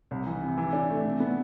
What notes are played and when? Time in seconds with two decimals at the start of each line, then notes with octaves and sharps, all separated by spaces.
0.11 C2
0.26 E3
0.42 C3
0.57 E3
0.73 D4
0.89 A3
1.05 C3
1.20 B3